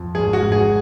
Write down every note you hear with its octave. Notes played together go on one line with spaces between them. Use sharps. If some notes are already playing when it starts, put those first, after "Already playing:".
Already playing: F2
G#1 G#4
F#4
G#2
G#4